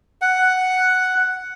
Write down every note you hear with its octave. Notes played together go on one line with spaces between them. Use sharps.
F#5